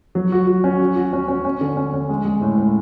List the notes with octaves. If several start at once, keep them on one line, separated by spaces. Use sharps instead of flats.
F#3
F#4
F#4
C#4
F#4
F#4
C#4
C#4
C#4
D3
C#4
C#4
G#3
G#3
A2
A2